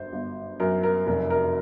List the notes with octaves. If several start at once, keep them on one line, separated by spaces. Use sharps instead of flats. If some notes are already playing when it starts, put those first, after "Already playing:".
Already playing: G1 F#2 C5
G1
F#2 A#4
A#4
F1 A#4
A#4